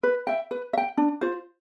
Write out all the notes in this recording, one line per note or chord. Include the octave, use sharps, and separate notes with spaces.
B4
E5 G5
B4
E5
G5
D4
F4 C5